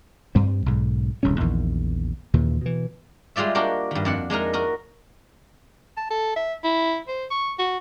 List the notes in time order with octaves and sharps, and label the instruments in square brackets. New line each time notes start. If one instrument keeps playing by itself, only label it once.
[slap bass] G2 G3 C4
B1 G#2
D#1 C2 G#2 C#4
A#1 E2 D#3
D#2 A#2 C#3 E3
B2 E3
[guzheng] G3 G#3 F4 D5 E5
A#3 D4 F#4 G4 A#4
G2 D#3
F2 D4 F#5
G#3 D4 D#4 A#4
F#4 A#4 D#5
[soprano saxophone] A5
A4
E5
E4
C5
C#6
F#4